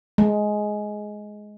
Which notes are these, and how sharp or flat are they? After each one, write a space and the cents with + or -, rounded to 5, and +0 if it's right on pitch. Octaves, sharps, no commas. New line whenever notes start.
G#3 +10